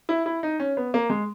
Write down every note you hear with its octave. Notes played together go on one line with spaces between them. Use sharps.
E4
E4
D#4
C#4
B3
A#3
G#3